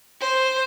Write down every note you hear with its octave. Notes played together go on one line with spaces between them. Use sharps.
C5